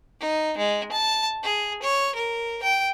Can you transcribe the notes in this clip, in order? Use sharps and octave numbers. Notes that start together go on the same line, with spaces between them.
D#4
G#3
A5
G#4
C#5
A#4
G5